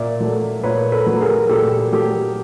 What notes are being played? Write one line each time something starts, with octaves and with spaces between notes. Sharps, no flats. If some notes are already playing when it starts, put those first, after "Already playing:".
Already playing: A#2 D5 E5
F#3 A3
A#2 B4 C#5
A4 B4
F#3 A3
G#4 A#4
A#2 G4 A4
F#3 A3 G4 A4